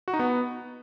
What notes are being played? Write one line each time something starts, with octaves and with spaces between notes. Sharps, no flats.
F#4
D#4
B3